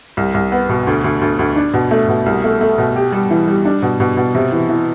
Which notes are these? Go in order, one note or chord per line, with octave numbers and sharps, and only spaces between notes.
C2
C2
B3
B2
D2
D2
D2
D2
D4
B2
A3
B2
C2
A3
A3
B2
G4
G3
E3
G3
D4
B2
B2
B2
C3
E3
E3